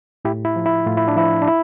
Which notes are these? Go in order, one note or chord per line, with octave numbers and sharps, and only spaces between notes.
A2 E4 G4
E4
F3
E4
A2 F4
E4
D4
F3 E4
D4
E4